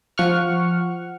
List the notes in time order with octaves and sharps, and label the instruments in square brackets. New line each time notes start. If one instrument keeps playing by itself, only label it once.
[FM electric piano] F3 F#5 C#6 F6